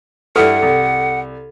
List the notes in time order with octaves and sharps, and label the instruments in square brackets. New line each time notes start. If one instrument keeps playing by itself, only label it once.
[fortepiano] G2 E4 F6 [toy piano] A4 [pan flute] F#5
[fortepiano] C2